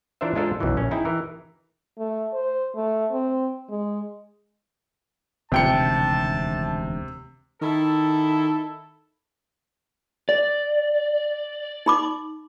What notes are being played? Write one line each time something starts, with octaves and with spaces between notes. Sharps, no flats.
E3 D4 F4 A#4 C5 E5
G#3 D4 F4 A4 A#4 C5
B1 F#2 D#3 E3
A#1 C#4
D#4 E4 G#4 G5
E3 A#4
A3
C5
A3
C4
G#3
E1 D2 C3 D#3 G5 A5 C#7
D#3 E4 A4
D5
D#4 B5 D6